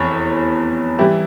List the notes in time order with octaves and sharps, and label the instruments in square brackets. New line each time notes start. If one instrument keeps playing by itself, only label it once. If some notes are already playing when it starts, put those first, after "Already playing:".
Already playing: [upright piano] F1 E2 E3 C#5
E3 G3 E4 G4